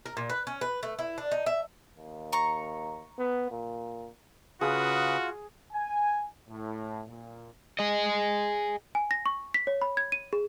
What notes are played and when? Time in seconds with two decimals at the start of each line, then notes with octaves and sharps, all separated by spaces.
0.06 A#4
0.17 A#2
0.30 B4
0.47 C#4
0.61 B4
0.83 A3
0.99 E4
1.18 D4
1.32 D#4
1.46 E5
1.98 D#2
2.32 A#5 C#6
3.19 B3
3.51 A#2
4.61 C#3 F4 F#4 G#4 B4 D#6
5.72 G#5
6.48 A2
7.08 A#2
7.79 G#4 D#5
8.95 G#5
9.11 A#6
9.26 C#6
9.54 B6
9.67 C#5
9.82 B5
9.97 G#6
10.12 D#7
10.33 G#4